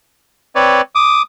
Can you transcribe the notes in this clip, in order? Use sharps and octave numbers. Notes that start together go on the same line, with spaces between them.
C4 B4 C#5 D5
D6 D#6